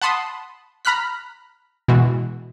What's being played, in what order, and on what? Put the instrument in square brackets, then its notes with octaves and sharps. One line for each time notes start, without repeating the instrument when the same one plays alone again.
[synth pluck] F#5 A5 B5 C6 D#6
A#5 B5 F6 F#6 B6
B2 E3 G#3 F#4